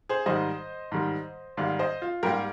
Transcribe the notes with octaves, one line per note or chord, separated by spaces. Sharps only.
G#4 C5
G#2 D#3 G3 C5 D#5
G#2 D#3 G3
G#2 D#3 G3 D5 F5
C5 D#5
F4
G#2 G3 A#3 G4 A#4